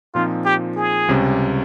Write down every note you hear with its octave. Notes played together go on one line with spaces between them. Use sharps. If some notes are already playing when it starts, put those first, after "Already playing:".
A#2 F3 C4 D#4 F4
G4
G#4
C#2 C3 G3 C#4